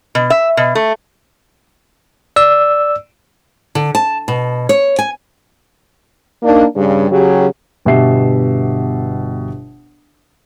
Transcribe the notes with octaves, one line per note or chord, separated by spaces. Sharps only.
B2
E5
B2
A3
D5 E6
D3
A5
B2
C#5
G#5
A#3 D4 D#4
G2 C#3 G3
C#3 F#3 G4
G1 B2 G4 E5 C7